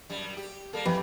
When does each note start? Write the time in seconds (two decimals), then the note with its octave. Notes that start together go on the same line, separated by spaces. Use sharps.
0.10 F#2 G3
0.37 G4
0.73 G3 A#3 A4
0.85 F2 E3 G4 B4 B5